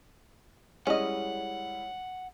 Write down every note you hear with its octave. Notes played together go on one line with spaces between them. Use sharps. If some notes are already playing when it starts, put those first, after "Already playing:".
G3 G#3 C#4 E4 D#5 F#5